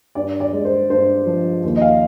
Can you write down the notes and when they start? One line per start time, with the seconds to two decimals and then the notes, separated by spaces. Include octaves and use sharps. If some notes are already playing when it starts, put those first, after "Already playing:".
0.15 G2 D5
0.40 D5
0.53 G#3
0.65 C5
0.90 G2 C5
1.26 F3
1.63 D#2
1.77 D#5
1.81 F5